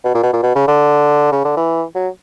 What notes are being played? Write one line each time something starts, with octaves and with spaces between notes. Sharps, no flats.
B2
A#2
B2
A#2
B2
C#3
D3
C#3
D3
E3
F#3